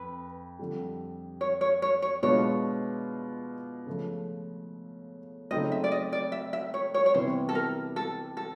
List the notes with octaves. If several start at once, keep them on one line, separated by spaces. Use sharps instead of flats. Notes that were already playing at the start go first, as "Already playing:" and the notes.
Already playing: F2 B4
F2 D3 G3
C#5
C#5
C#5
C#5
B2 G#3 B3 D4 F4 C#5
C#3 F3 A3
C#3 F#3 A3 C4 D#4 D#5
E5
D5
D#5
D5
E5
E5
C#5
C#5
C#5
C3 E3 G3 B3 C5
A4
A#4
A4
A4